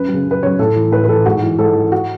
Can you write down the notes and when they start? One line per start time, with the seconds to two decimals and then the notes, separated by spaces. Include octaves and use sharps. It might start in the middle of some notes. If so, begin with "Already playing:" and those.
Already playing: F#2 B4
0.08 F#3
0.14 C#3
0.25 F#2
0.31 B4
0.42 C#3 F#3 C#5
0.59 A2 A4
0.76 E3
0.92 A2 B4
1.04 B4
1.09 E3 A4
1.26 G#2 F#4
1.42 E3
1.58 G#2 A4
1.75 E3
1.92 F#4